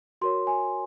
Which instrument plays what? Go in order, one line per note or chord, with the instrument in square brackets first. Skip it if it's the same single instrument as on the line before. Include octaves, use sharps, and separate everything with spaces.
[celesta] F#4 A#4 C#5 C6
G#5